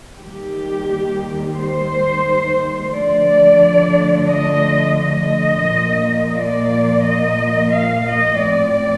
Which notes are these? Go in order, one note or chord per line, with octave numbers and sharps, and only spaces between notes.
D#2 D#3 G3 G4
C5
D3 F3 A3 D4 D5
D#5
D#5
A#2 F3 A#3
D5
D#5
F5
D#5
A2 F3 C4 D5